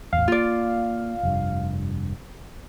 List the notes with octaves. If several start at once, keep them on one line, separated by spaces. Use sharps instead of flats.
A1 E2 F5
A#3 F4 D5
F1 G2